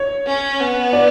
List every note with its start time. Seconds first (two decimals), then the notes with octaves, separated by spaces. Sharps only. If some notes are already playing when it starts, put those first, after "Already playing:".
Already playing: C#5
0.27 C#4
0.60 B3
0.93 D5